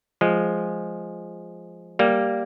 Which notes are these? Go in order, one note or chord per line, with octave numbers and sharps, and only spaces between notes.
F3 G#3
G3 A#3